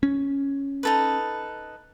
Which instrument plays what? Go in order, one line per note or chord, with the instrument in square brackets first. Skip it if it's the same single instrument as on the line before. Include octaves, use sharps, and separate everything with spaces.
[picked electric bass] C#4
[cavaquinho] D#4 A4 B4